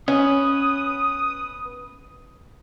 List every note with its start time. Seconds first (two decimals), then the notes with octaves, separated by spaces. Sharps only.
0.08 B3 C#4 D#6